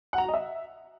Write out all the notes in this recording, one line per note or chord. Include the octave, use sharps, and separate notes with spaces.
F#5
A#5
F#4
D#5
E5